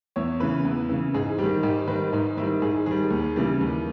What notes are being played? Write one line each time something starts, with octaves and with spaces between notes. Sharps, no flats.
E2 C#5
C#3 E3 B4
E2
C#3 E3
G#2 G#4
D#3 G3 G4
G#2 G4
D#3 G3 B4
G#2 D#4
D#3 G3 E4
G#2 G#4
D#3 G3 G#4
D#2
C#3 E3 G3
D#2